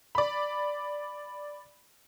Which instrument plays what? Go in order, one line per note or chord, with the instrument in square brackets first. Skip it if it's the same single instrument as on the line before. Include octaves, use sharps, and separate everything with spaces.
[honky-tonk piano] D5 B5